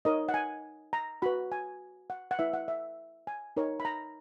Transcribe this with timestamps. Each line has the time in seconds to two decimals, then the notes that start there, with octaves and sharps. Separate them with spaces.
0.05 D#4 A#4 C#5 D#5
0.29 F#5
0.34 G#5
0.93 A#5
1.22 F#4 B4 B5
1.52 G#5
2.10 F#5
2.31 F#5
2.39 E4 B4 E5
2.53 F#5
2.68 E5
3.27 G#5
3.57 D#4 A#4 C#5
3.80 B5
3.85 A#5